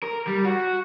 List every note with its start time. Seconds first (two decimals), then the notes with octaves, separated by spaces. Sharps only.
0.03 A#4
0.27 G3
0.45 F#4